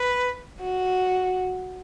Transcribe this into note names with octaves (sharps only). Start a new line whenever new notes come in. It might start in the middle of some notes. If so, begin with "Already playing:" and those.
Already playing: B4
F#4